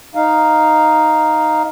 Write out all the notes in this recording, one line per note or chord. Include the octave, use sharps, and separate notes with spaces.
D#4 F5